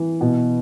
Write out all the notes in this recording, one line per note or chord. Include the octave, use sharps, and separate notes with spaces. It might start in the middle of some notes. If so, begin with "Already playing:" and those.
Already playing: E3
B2